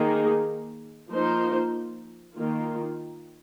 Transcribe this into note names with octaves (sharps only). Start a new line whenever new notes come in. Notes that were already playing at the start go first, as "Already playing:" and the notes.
Already playing: D#3 A#3 D#4 G#4
F3 A#3 D#4 C5
D#3 A#3 F4